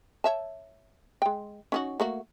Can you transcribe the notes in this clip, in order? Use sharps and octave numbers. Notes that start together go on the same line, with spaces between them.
C#5 E5 A5
G#3 G5
C#4 D#4 F#4
A3 A#3 F#4